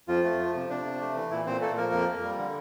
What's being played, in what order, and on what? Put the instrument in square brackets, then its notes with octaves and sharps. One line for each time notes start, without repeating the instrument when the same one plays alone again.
[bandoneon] F2 F3 F4
A3
F3
C3
C3 D4
C3
A3
E3
A#2 E4
A#2 C4 C5
A3 A#3 A4
F3 A#3 A#4
F2
A#3
G3
D3